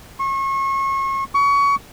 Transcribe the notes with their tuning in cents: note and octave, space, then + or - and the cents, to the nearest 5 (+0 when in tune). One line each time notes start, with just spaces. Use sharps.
C#6 -35
C#6 +25